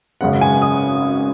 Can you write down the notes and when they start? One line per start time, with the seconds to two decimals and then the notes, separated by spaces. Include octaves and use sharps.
0.21 G#1 F#2 C#3 G#3 F#5
0.41 G#5
0.62 D#6